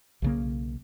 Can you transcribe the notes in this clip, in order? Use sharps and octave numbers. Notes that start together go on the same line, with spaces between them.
B1 C#3 A#3